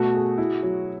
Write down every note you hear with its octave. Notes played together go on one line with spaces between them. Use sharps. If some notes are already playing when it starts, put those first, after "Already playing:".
Already playing: B2 A3 F#4
G#4
E4
F#3